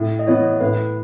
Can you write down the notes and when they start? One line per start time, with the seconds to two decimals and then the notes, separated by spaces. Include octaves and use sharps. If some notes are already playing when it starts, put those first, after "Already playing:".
Already playing: A2
0.19 D#5
0.26 E3 B3 C#5
0.61 A2 B4